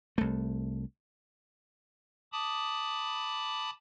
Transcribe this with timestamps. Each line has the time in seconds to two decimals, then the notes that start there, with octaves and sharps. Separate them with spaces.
0.18 C2 A3
2.32 A5 B5 D6 D#6